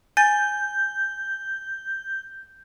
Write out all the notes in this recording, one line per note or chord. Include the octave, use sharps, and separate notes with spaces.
G#5 G6 A6